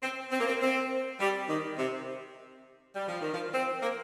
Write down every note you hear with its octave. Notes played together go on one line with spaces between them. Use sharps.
C4
C4
A#3
C4
C4
G3
D#3
C3
G3
F3
D#3
F3
C4
A#3